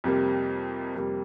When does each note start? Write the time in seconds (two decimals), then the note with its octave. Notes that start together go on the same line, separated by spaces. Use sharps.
0.04 F2 C3 G3 A#3
0.96 F2 C3 G3 A#3